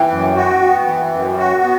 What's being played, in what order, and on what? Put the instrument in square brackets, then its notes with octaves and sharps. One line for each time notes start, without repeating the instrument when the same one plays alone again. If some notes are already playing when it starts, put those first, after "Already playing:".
Already playing: [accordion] E3 [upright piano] G5
[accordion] F#2
F#4
B3
E3
F#2
F#4
B3